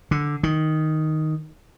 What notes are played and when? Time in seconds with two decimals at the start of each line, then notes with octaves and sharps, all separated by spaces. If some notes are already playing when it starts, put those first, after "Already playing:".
0.11 D3
0.43 D#3